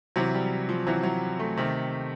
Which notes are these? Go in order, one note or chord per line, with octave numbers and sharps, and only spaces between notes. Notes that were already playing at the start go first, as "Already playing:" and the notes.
C3 E3 F#3
G3
F3
C3 E3 F#3
F#3
A3
C3 D#3